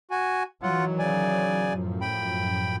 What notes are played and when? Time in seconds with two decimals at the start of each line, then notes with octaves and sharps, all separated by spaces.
0.11 F#4 G#5
0.63 D#3 E3 F#3 F4 F#5
0.99 C#3 D5 G#5
1.68 F#2 A2 F3
2.01 G5 B5